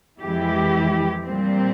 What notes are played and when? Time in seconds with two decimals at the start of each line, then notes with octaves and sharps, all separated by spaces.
0.23 F2 E3 G#3 E4 G4
1.26 A#2 G3 C4